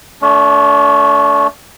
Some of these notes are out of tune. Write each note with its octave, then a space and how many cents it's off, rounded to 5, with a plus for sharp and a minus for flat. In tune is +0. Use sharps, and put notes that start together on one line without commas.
A3 +0 D4 -40